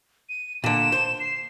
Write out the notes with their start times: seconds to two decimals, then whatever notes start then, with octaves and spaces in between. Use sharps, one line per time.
0.29 D#7
0.64 A#2 D3 E7
0.92 C5
1.20 C7